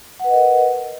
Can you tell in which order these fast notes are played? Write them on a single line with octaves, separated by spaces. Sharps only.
F#5 B4 D#5 A#4